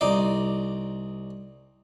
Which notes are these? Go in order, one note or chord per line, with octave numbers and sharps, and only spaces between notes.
C2 D#4 D5